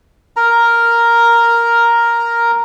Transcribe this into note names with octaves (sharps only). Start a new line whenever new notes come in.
A#4 A#5